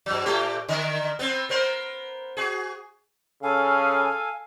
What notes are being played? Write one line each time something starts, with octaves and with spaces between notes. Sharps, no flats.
G2 F#3
A2 A3 G4
D3 A#4
B3 C4
B3 A#4 C5
F#4 G#4
C#3 A4 F5 G#5